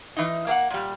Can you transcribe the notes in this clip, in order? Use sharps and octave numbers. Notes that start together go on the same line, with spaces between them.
E3 D#4
A#3 F5 F#5
A#2 G3